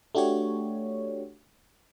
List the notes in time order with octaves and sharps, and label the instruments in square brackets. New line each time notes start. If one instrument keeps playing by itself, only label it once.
[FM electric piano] A3 D4 F#4 G4 C#5